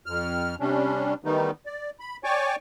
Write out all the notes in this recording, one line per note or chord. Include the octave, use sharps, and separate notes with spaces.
F2 F6
C3 G3 C#4 D4
D#3 E3 G3 A3 B3 D#4
D5
B5
C#5 D5 G5 G#5 C#6 D6